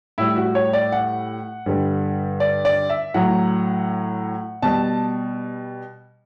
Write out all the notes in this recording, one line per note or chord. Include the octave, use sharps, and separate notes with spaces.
A2 G3 E4
F#4
C#5
D5
F#5
G2 D3 G3
D5
D5
E5
A2 F#3 F#5
B2 G3 A5